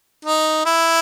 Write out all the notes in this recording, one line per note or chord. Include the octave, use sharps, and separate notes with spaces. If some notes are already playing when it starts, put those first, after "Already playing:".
D#4
E4